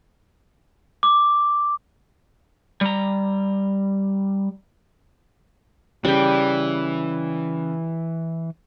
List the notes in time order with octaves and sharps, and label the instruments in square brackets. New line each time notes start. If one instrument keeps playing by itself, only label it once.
[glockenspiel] D6
[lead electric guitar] G3 A#5
[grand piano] C#3 [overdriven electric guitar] E3 [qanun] G3 G5